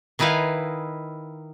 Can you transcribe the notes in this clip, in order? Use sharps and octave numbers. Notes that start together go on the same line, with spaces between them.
D#3 D#4 E4 B4 F5 G#5